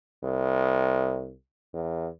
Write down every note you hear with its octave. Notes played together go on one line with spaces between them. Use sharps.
C2
E2